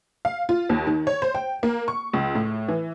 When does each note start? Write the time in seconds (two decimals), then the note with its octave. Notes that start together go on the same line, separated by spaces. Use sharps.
0.25 F5
0.49 F4
0.69 D#2
0.87 D#3
1.07 C#5
1.22 C5
1.35 G5
1.63 A#3
1.88 C#6
2.13 C#2
2.35 A2
2.68 E3